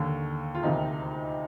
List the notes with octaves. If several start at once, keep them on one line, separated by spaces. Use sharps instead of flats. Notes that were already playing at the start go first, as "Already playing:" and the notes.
Already playing: D#2 D3
F4
D2 C3 D#3 D#4